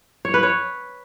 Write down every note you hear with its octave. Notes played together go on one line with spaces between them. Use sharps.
C#5
B4
C#5